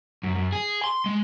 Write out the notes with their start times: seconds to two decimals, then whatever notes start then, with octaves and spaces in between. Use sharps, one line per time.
0.23 F#2
0.35 F#2
0.53 G#4
0.84 C6
1.06 G#3